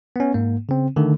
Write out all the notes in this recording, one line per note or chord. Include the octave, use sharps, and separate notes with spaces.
B3 C#4
G#2 A#3
C#3 C4
D3 D#3 A3